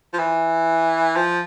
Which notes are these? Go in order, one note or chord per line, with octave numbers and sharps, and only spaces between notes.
F3
E3
F3